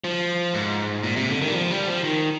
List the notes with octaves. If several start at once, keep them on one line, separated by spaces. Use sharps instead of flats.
F3
G#2
A#2
C3
D3
D#3
G3
F3
G3
F3
D#3